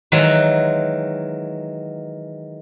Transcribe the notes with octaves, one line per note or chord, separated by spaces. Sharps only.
D#3 E3 F#3 G#3